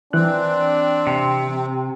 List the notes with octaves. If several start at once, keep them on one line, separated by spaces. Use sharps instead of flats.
E3 C4 D4 F#6
C3